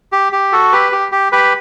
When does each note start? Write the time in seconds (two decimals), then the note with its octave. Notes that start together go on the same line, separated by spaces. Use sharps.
0.12 G4
0.32 G4
0.52 F#4 A4
0.72 G4 B4
0.92 G4
1.12 G4
1.32 G4 B4